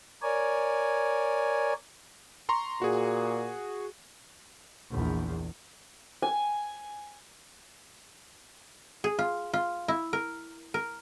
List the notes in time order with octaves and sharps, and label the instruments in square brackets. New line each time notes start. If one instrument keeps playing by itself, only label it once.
[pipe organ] A#4 C#5 D5 G#5
[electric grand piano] A#5 C6 C#6
[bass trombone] A#2 [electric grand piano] F#4 G#4
[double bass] A#1 E2
[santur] G#5
[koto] G#4
F4
F4
E4
A#4
A#4